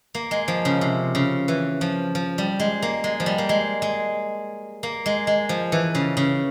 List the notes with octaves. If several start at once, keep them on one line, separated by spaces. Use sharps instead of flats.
A#3
G#3
F3
C#3
C3
C#3
E3
F3
F3
G3
G#3
A#3
G#3
F3
G3
A#3
G#3
G#3
A#3
G#3
G#3
F3
E3
C#3
C#3